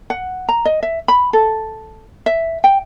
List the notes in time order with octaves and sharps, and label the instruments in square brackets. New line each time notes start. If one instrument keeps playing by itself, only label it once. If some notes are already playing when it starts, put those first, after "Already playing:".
[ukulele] F#5
A#5
D#5
E5
B5
A4
E5
G5